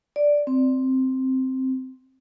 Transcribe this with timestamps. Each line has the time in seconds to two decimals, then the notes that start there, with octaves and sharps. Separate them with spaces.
0.16 D5
0.47 C4